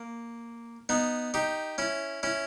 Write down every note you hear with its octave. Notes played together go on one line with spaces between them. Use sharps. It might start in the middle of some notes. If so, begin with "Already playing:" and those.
Already playing: A#3
B3 D#4
D#4 G4
C#4 E4
C#4 E4